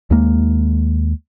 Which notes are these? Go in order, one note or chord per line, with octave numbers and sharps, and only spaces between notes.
D#2 G#3 A#3